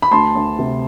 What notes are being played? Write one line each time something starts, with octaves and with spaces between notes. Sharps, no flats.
B5
D2 A5 C6
D2
C3